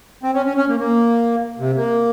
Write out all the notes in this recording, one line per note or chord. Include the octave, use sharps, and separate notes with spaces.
C4
C#4
C#4
C#4
A#3
A#3
C3
A#3